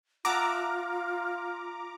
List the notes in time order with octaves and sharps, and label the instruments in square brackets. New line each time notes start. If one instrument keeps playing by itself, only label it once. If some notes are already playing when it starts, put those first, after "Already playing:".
[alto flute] F4 [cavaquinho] E5 F#5 A5 [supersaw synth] A#5 D6